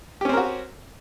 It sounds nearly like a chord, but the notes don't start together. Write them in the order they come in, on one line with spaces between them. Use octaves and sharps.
G4 C#4 C4 A#4 F#4